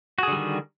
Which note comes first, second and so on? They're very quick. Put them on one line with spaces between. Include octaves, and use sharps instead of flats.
F#4 G#4 D3 G3 D#3